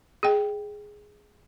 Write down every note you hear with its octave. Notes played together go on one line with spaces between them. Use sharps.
G#4 D#5 G5